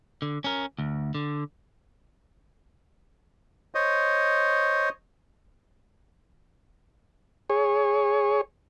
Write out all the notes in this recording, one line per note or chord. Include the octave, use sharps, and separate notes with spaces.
D3
C#4 A#4
D2
D3
C5 C#5 D#5
G#4 C#5